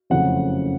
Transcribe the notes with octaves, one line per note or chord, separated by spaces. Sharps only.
F#1 F2 C#3 A3 C4 F#5